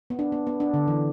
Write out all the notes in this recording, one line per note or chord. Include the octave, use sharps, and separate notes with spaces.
B3
D4
B3
B3
D4
D3
E3